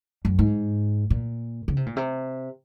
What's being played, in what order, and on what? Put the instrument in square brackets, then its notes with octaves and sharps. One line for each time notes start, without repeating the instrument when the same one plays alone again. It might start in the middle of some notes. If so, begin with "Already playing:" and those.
[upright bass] F#2
G#2
A#2
C#3
C3
A#2
C3